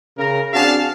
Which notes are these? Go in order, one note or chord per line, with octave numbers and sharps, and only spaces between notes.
C#3 A#4
C4 D4 F#4 G#4 F5 A5